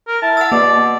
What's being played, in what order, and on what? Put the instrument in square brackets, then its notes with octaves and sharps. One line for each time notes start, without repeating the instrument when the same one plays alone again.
[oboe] A#4
[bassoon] E4 [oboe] A5
[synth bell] F#5 E6
[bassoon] B2 [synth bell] A#3 [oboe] D5